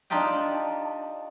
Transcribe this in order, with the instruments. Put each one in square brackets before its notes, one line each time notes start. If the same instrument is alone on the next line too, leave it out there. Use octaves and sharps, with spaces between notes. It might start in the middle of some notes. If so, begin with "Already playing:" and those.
[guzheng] D4 D#4 F4 G4 G5